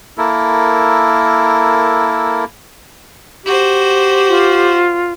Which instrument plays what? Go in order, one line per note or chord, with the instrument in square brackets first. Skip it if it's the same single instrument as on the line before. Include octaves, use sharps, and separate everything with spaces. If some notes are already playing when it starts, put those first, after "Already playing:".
[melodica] A#3 E4 A4 A#4
[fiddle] F#4 C5 [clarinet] G4
[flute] F4